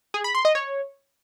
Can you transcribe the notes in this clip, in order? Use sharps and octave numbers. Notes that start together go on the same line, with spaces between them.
G#4
B5
C6
D#5
C#5